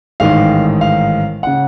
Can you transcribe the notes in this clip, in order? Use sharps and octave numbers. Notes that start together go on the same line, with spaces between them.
A1 G#2 D#3 F5
F5
C#3 F#5